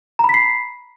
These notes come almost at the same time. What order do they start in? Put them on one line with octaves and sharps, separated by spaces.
A#5 B5 B6 C7